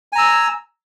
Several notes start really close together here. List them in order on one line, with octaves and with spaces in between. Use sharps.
G#5 A#5 E6